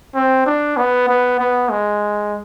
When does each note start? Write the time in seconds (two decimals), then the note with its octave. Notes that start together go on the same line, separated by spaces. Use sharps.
0.15 C4
0.46 D4
0.77 B3
1.08 B3
1.39 B3
1.71 G#3